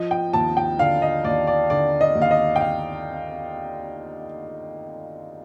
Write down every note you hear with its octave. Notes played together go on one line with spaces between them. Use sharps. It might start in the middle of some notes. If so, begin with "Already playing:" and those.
Already playing: F3 D#5
G5
D#2 A5
G5
D3 F5
D#5
D#2 D5
D5
D3 D5
D#5
D#2
F5
D#5
G5
F5